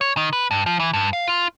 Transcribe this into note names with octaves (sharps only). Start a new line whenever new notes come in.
C#5
D#3
B4
G2
F3
E3
G2
F5
F4